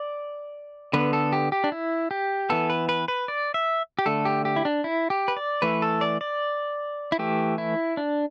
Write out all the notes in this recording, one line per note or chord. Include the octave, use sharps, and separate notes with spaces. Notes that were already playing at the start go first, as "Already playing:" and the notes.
Already playing: D5
D3 B3 B4
A4
G4
G4
D4
E4
G4
E3 B3 A4
B4
B4
B4
D5
E5
G4
D3 A3 A4
G4
G4
E4
D4
E4
G4
B4
D5
E3 A3 B4
A4
D5
D5
E4
E3 A3 G4
E4
D4